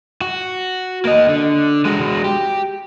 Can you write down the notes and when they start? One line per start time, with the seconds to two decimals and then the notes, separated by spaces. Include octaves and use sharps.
0.21 F#4
1.05 A#3 D#5
1.29 D3
1.85 G#3 F#4
2.24 G4